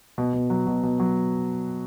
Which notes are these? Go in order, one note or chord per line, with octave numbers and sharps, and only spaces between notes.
B2
B2
F#3
B2
B2
F#3